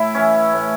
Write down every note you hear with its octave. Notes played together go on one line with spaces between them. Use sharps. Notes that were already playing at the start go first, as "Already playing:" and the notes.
Already playing: A2 E4
E3 C#4
A2